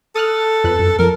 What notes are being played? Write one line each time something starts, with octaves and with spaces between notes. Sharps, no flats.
A4 D#6 F6 F#6
F2 B4 F#6
F#2
F2 A#4